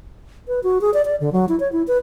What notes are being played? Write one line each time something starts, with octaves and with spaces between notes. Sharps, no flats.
B4
F#4
G#4
D5
D5
D3
F#3
E4
C#5
E4
B4